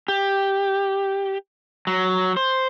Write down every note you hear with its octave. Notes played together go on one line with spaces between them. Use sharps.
G4
F#3
C5